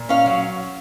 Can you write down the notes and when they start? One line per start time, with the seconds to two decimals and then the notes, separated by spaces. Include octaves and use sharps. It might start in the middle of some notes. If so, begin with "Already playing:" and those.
Already playing: A#2
0.09 C#4 F5
0.26 F#3